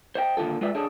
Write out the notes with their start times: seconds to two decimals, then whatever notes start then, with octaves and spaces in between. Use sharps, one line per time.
0.15 C5 D#5 G5
0.37 D#2 A#2 D3 F4 A4
0.61 G#3 F4 B4 D5 E5
0.75 D4 G#4 A4 C#5 D#5